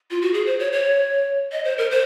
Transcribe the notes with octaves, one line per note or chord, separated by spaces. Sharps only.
F4
F#4
G#4
C5
C#5
C#5
D#5
C5
A#4
C5